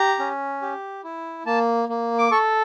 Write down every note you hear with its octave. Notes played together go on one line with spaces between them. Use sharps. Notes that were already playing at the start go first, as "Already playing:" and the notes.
Already playing: G4 A#5
C#4
G4
E4
A#3 A5
A#3
D6
A4 C#6